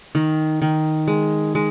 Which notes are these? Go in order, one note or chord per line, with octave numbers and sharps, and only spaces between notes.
D#3
D#3
G#3
G#3